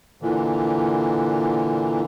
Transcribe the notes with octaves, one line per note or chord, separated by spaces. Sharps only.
A#2 D3 E3